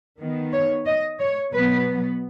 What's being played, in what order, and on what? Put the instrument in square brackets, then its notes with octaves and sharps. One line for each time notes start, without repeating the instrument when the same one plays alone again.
[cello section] D#3 B3
C#5
D#5
C#5
B2 F#3 B3 B4